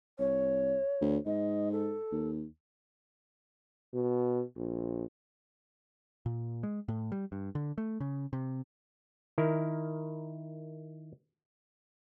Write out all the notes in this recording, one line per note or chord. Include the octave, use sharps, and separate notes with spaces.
C2 C#5
D2
G#2 D#5
A4
D#2
B2
A#1
A#2
G#3
A2
G3
G2
D3
A3
C#3
C3
D#3 E4 A#4